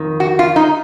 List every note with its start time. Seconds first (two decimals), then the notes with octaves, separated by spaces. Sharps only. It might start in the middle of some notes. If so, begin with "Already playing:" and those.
Already playing: F2 D#3
0.20 F#4
0.39 F4
0.56 D#4